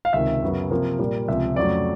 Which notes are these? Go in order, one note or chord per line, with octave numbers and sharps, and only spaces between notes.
F5
C#2 C3 D#3 E5
F#2 C#3 F#3 B3
C3 F3 A#3
A#2 G3 A#3
C#2 C3 F3 E5
F2 C#3 F#3 A3 D5